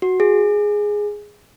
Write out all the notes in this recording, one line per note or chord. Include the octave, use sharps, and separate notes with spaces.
F#4
G#4